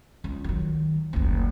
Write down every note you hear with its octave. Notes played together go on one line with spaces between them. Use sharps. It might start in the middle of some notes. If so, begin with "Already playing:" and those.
C#2
D#3 F#3
F#1 D2